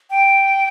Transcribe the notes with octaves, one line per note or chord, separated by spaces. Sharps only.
G5